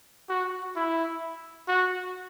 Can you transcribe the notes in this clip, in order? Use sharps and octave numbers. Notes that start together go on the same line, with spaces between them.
F#4
E4
F#4